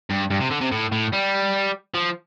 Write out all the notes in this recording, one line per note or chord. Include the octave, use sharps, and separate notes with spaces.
G2
G2
C3
D3
C3
A2
A2
G3
F3